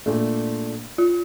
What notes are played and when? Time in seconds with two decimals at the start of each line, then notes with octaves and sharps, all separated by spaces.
0.06 A#2 A3 D4
0.98 F4